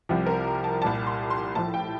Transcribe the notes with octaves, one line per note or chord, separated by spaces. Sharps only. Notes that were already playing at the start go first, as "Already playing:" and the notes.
C2 C3 F3 G4
A#4
A5
C2 A#2 G3 A5
C6
C6
A2 F3 A5
G5